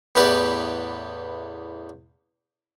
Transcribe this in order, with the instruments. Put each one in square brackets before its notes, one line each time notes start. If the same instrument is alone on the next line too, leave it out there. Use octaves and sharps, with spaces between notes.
[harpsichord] A1 E2 B3 G4 B4 D5